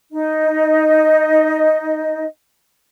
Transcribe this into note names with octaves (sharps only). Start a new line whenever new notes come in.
D#4 D#5